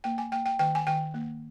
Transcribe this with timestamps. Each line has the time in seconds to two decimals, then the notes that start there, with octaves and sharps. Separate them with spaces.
0.04 A#3 G5
0.18 G#5
0.32 A#3 G5
0.46 G5
0.59 D#3 G5
0.75 G#5
0.87 D#3 G5
1.14 A#3